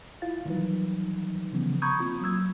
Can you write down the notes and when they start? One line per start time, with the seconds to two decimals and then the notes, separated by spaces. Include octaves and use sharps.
0.22 E4 F4 F5 A6
0.45 D#3 E3 F#3 G3 D#4 B4
1.53 C#3 E3 F3 G3 B3 C#4
1.82 A#5 B5 C#6 D#6 G6 G#6
2.00 A#3 C4 F4
2.21 F#3 A#3 E6 G#6